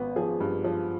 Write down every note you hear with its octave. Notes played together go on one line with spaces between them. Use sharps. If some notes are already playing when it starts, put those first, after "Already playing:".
Already playing: G#1 B3
F3 G#4
G2
F3